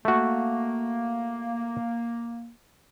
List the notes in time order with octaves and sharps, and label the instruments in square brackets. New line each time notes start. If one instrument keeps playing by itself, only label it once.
[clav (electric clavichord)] A3 F#4 [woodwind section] A#3